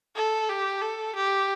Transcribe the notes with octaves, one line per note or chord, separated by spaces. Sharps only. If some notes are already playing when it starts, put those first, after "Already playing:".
A4
G4
A4
G4